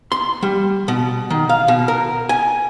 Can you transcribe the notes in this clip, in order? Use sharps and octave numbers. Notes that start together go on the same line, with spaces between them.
C6
G3
B2
D#3
F5
B2
A#4
G#5